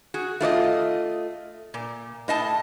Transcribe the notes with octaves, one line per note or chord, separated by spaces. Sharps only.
F#4 G#4
A3 F4 D5 D#5
A#2
A2 D#5 A5